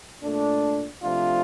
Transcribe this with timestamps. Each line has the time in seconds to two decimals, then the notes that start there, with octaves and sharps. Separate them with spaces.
0.22 A#2 A3 D4
1.03 C3 F3 A3 D4 F4